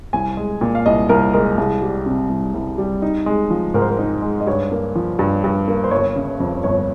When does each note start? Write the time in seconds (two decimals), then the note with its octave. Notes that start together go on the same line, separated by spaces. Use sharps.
0.13 C2 G#5
0.37 G#3
0.61 A#2
0.75 F5
0.86 C2 D#5
1.09 C2 A#4
1.34 G#3 A#4
1.57 C2 G#4
1.82 G3
2.06 C3
2.29 C2
2.54 C2
2.78 G3
3.02 D#4
3.26 G#3
3.50 F3
3.74 G#2 A#4
3.82 C5
3.90 A#4
3.98 D#4
4.22 G#3
4.40 D#5
4.47 G2 C#5
4.72 A#3
4.95 F3
5.19 G2
5.44 G2
5.68 A#3
5.84 C5
5.91 G1 C#5
6.16 C#3
6.40 F2
6.64 G1 C#5